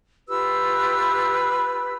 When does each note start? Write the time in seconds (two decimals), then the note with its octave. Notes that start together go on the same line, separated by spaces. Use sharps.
0.28 F4 G4 B4 E6